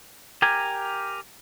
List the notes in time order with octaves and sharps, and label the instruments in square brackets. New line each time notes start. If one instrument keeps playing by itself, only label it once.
[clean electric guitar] G4 A#4 G#5